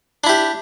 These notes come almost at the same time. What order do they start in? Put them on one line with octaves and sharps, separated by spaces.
D4 E4 G4